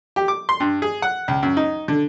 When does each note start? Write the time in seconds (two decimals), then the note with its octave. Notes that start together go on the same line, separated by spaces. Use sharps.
0.16 G4
0.28 D6
0.49 C6
0.60 G2
0.82 G#4
1.02 F#5
1.28 C#2
1.43 F#2
1.57 D#4
1.88 D3